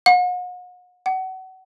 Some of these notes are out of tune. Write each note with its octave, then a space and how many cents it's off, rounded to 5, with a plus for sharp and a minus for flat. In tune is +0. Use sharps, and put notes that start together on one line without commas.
F#5 -40
F#5 +30